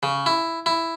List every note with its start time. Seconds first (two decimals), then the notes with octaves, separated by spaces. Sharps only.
0.03 C#3
0.26 E4
0.66 E4